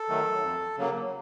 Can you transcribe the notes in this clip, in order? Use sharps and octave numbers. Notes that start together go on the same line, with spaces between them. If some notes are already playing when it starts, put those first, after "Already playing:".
Already playing: A4
D#3 F#3 A3
F2
C#3 F#3 A#3